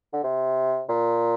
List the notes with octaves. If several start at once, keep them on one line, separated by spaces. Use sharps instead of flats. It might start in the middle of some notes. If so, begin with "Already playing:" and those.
D3
C3
A#2